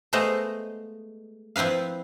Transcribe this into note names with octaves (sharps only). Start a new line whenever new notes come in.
G#3 A3 B3 C5 D#5 F5
F3 C4 E4 B4 F5